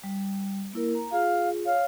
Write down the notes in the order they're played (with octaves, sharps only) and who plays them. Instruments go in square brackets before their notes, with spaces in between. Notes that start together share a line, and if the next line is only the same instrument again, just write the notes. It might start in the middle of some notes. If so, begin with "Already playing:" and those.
[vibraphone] G3
A#3 E4 A#4
A#5
[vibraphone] F4 G#4 [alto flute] F5
[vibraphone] C#5 [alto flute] F5